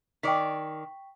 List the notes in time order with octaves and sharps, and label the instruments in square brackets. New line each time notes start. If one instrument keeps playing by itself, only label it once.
[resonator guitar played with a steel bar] D#3 D5 [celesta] G5 C#6 B6